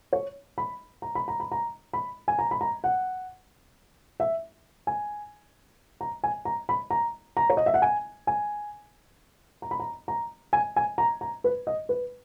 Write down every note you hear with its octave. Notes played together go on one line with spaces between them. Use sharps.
C#5
B5
A#5
B5
A#5
B5
A#5
B5
G#5
A#5
B5
A#5
F#5
E5
G#5
A#5
G#5
A#5
B5
A#5
A#5
C#5
D#5
E5
F#5
G#5
G#5
A#5
B5
A#5
A#5
G#5
G#5
A#5
A#5
B4
D#5
B4